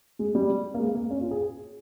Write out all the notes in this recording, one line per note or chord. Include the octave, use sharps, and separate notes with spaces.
G#3
G3
A#3
G#3
A#3
C#4
F4
G#4